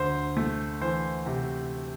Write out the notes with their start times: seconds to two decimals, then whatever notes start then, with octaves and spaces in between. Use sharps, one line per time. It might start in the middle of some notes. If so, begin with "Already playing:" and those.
Already playing: D2 C5
0.37 A3
0.81 E3 C5
1.26 C3